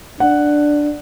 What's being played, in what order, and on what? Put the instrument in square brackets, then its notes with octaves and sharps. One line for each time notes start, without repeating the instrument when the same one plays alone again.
[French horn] D4 [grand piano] F#5